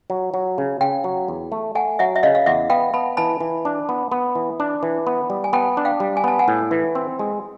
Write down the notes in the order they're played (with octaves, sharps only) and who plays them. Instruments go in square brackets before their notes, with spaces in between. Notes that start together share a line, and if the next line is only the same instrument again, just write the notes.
[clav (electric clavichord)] F#3
F#3
C#3
[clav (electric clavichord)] C#3 [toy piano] F5 G5
[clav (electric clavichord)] F#3
E2
A3
[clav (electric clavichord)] A3 [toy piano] F#5 G#5
[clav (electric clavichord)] F#3 [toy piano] E5 F#5
[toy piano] E5
[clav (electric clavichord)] C#3 [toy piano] D#5 F5
[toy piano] F5
[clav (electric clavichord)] E2 [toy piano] E5 F#5
[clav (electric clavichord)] B3 [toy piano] F5 G5
[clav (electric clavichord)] B3 [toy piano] A5 B5
[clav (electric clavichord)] E3 [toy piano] A5 B5
[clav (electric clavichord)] E3
D4
B3
B3
E3
D4
E3
B3
G3
[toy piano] G#5
[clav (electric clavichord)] B3 [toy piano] G5 A5
[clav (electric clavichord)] D4
[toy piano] F5 G5
[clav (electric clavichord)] G3
[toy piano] G#5
[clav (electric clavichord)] B3 [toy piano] A5
[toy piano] F#5 G#5
[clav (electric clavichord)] A2
E3
C4
G#3